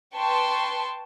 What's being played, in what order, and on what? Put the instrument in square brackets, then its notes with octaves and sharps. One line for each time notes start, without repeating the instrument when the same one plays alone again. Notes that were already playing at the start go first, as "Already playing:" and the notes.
[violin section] B4 G5 A5 C6 C#6